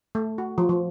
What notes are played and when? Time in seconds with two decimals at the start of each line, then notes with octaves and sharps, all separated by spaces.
0.15 A3
0.38 F#4
0.58 F3
0.69 F3